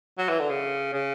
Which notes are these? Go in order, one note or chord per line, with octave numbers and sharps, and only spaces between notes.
F#3
E3
D3
C#3
C#3